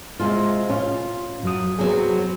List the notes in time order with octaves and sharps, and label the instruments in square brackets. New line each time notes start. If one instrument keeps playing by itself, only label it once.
[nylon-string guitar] C3 G#3 F4
[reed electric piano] A2 C#4 [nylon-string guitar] F4
[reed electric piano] F#2 F#3 D#6
[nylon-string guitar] C3 F#3 B3 [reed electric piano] G#4